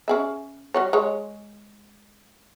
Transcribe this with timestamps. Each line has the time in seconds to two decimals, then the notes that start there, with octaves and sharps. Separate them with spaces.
0.08 C#4 G#4 E5
0.74 G3 F#4 C#5
0.93 G#3 C#5